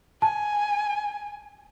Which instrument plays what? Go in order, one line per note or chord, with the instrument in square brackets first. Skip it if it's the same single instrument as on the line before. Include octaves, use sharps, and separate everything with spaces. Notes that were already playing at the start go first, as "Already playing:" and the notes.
[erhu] G#5 [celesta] A5